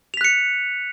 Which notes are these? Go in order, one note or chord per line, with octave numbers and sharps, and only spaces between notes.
F#6 B6 C#7 F7